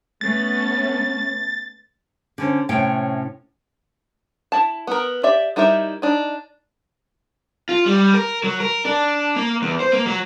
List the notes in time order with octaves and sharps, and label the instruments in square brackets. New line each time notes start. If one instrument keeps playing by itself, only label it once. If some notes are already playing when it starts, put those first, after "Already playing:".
[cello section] A3 B3 C#4 [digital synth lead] A6
[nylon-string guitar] D3 C#4 C5
A2 C3 C#4 G5
[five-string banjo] E4 A5
B3 A#4
G4 D5 E5
G3 D#4 E4 A#4 E5
D4 D#4
[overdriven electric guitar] F4
G3
A#4
F#3
A#4
D4
A#3
E2
C5
A#3
F#3